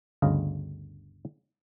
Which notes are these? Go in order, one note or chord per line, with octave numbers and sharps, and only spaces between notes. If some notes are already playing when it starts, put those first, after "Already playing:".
G1 D2 C#3 D#5 F5